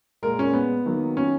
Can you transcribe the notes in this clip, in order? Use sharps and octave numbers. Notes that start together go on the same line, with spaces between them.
A#2 G#3 A#4
C#4
B3
D#3 F#3 A#3
C#4